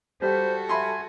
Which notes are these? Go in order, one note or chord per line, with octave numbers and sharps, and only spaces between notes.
G3 F#4 A4 C5
E5 G#5 B5 C6